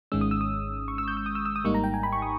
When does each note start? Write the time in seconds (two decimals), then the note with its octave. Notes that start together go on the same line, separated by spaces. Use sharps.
0.12 G#1 G#2 D#3 G#3 C#4 E6
0.21 D#6
0.31 E6
0.41 D#6
0.88 C#6
0.98 E6
1.08 G6
1.17 E6
1.26 D#6
1.35 E6
1.45 E6
1.56 D#6
1.64 G#1 G#2 G3 A#3 D#4 C#6
1.74 A#5
1.84 G5
1.94 G#5
2.03 B5
2.12 C#6
2.22 D#6